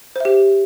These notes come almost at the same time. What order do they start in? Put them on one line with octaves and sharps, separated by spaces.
C5 E5 G4